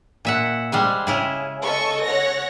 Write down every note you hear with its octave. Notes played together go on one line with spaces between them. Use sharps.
A#2 E5 F#5
G3 G#3 C5
C#3 E4 G#4
A4 D#5 C#6
C#5 F#5 A#6